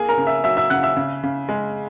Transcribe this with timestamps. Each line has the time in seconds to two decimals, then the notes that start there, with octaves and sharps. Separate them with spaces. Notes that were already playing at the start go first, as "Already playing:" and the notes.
Already playing: A#3 G#4 G#5
0.09 A#4 A#5
0.18 C#3
0.27 E5 E6
0.44 F#3 E5 E6
0.57 E5 E6
0.70 C#3 F#5 F#6
0.83 E5 E6
0.96 C#3
1.23 C#3
1.49 G#3